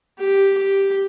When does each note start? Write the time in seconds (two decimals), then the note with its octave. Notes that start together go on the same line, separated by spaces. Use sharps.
0.19 G4
0.58 G4